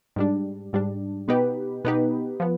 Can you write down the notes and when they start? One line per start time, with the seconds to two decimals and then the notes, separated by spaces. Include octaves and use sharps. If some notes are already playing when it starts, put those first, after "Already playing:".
0.16 G#2 G3 D4
0.73 G#2 G3 D4
1.28 B2 B3 D#4 G4 B4
1.84 B2 B3 D#4 G4 B4
2.40 F3 B3